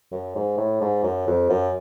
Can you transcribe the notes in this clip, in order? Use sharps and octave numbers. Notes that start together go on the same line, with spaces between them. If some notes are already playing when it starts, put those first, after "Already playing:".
F#2
G#2
A2
G#2
F#2
F2
F#2